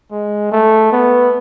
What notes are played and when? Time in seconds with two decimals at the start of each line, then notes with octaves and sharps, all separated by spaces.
0.11 G#3
0.52 A3
0.92 B3